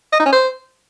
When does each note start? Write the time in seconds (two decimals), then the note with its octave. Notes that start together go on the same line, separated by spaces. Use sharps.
0.13 D#5
0.19 D#4
0.26 C#4
0.33 C5